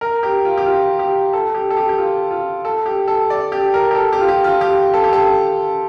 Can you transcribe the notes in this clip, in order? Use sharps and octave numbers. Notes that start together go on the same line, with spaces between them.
A#4
G4
F4
G4
F4
G4
A4
G4
A4
G4
G4
F4
F4
A4
G4
A4
D5
G4
A#4
G4
A4
G4
F4
G4
F4
G4
A4
G4
A4